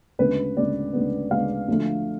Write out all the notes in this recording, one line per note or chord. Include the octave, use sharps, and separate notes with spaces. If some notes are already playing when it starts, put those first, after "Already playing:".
D2 C#3 G#3 B3 B4
D2 C#3 G#3 B3 D5
D2 C#3 G#3 B3
D2 C#3 G#3 B3 F5
D2 D3 F3 A3